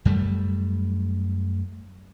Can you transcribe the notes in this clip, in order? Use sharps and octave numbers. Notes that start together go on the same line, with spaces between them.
F#2 G3 A3